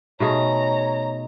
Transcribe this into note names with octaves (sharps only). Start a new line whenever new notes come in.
B2 A3 D#4 G#4 C#5 D#5 A#5